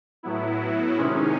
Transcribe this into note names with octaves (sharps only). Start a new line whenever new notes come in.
A2 F#3 B3 E4
C3 D#3 G#3 C#4